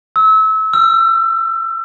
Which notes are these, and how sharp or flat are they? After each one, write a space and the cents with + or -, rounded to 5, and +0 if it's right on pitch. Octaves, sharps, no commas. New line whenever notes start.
E6 -30
E6 +35